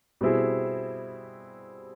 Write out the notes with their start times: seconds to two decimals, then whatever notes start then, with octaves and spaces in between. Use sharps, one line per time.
0.21 B2 G3 C4 E4 G#4